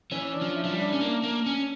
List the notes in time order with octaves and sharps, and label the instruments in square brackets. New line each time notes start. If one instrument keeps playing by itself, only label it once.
[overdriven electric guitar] E3 [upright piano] C#4
[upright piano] D4
[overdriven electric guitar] F3
[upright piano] E4
[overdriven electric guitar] F3
G3
[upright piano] D4
[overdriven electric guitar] C#4
[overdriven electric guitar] A#3 [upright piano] D4
[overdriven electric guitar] A#3
C#4